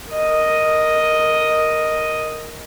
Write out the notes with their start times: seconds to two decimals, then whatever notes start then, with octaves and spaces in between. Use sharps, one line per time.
0.11 A#4 D#5